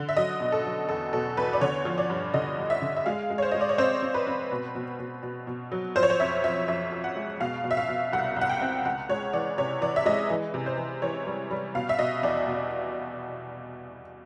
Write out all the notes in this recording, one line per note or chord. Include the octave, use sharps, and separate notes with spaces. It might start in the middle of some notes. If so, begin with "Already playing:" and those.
Already playing: D3
E5
F#3 D#5
B2
A4
F#3
E2 A4
B2 A4
E2 B4
D5
D3 C#5
F3
D5
G2
D3 D#5
G2
E5
D3
E5
G#3 F5
G#3
C#5
C5
G#3 D#5
D5
C#5
C4 C5
C4
B4
C4
B2
B2
B2
B2
B2
F#3
F3 C5
C#5
C5
F2 E5
F3 E5
F2 E5
F3
F#5
G#3
B2 F5
B2
E5
F5
B2
C2 F#5
C2 F#5
G5
C4
C#2 F#5
G#3 C#5
E3 D5
C3 C#5
E3 D5
E5
G#3 D#5
E3
C3
C5
E3
E3 C#5
G3
G3
B2 F5
E5
B2 D#5
E2 D5
B2